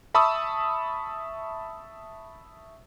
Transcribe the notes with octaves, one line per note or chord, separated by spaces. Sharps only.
E5 A5 B5 C#6 D#6 E6